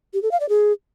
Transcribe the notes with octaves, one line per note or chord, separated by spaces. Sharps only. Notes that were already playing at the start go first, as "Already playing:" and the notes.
G4
A4
F5
D5
G#4